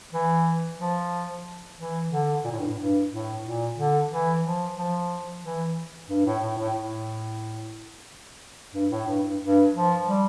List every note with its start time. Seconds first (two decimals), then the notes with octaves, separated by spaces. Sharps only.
0.12 E3
0.79 F3
1.78 E3
2.11 D3
2.44 A#2
2.52 A2
2.59 G2
2.67 A2
2.78 G2
3.11 A2
3.44 A#2
3.76 D3
4.10 E3
4.43 F3
4.76 F3
5.43 E3
6.09 G2
6.26 A2
6.42 A2
6.58 A2
6.75 A2
8.74 G2
8.91 A2
9.07 G2
9.23 G2
9.40 G2
9.74 F3
10.07 G3